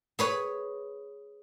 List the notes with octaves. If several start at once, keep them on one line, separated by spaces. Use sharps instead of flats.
G#4 B4 C#5